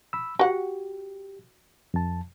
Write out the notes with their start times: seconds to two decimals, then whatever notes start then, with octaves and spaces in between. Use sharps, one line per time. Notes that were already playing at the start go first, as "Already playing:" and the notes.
0.13 B5 E6
0.39 F#4 G4 F#5
1.94 F2 A5